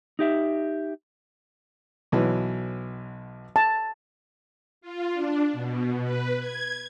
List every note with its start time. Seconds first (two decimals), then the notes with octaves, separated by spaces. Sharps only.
0.19 D#4 G4 E5
2.12 B1 E3 F#3
3.56 A5
4.81 F4
5.13 D4
5.53 B2
6.02 B4
6.39 G#6